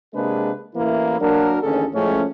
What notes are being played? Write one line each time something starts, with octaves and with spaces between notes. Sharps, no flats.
C3 G#3 A#3 D4 G#4 B4
A1 E3 A#3 E4
F#3 A#3 D4 F#4 A#4
A1 D#2 D3 C#4 G#4 A4
A2 F3 G#3 A3 C#4